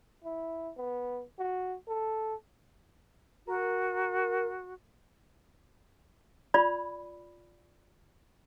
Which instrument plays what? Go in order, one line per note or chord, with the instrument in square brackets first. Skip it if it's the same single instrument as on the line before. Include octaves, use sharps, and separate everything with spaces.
[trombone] E4
B3
F#4
A4
[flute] F#4 [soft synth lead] A#4
[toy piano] F4 D5 B5